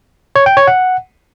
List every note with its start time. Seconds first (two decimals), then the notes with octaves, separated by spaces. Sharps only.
0.36 C#5
0.46 G5
0.57 C#5
0.67 F#5